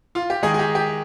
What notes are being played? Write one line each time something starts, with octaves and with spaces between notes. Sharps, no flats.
F4
G4
D#3 G#3 D#4 G#4
G#4
G4
G4